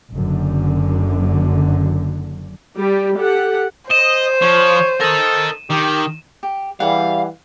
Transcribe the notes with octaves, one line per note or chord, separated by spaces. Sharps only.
F#1 F#2 D3
G3 G4
G4 A4 F#5
C5 D#5 D#7 E7
F3 C#5
A4 A#4 D#5
D#3 G4
G4
E3 G3 G#4 F5 F#5